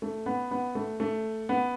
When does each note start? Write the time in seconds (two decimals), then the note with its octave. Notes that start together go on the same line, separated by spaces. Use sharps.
0.02 A3
0.26 B3
0.51 B3
0.75 A3
1.00 A3
1.49 B3